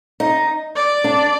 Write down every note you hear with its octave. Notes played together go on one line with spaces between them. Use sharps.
D#4
D5
D4